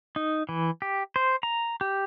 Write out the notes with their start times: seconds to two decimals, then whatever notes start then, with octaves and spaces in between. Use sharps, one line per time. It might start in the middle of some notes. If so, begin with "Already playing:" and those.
0.16 D#4
0.49 E3
0.82 G4
1.16 C5
1.43 A#5
1.81 G4